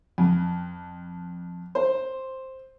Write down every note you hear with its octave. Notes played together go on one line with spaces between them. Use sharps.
F2
C5